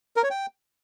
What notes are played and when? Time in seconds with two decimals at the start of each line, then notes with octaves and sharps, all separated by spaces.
0.17 A#4
0.24 C#5
0.31 G5